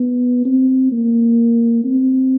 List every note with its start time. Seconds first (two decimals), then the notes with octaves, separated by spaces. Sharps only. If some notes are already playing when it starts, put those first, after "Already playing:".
Already playing: B3
0.45 C4
0.92 A#3
1.84 C4